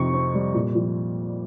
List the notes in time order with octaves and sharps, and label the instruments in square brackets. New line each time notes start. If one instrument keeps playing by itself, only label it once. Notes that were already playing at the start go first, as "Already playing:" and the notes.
Already playing: [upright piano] F2 C3 D#4 C#6
C4
G3
A#2
F3